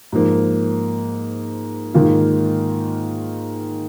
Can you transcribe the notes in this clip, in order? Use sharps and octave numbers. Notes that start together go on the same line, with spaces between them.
G#2 F3 A#3
G#2 D#3 A#3 F4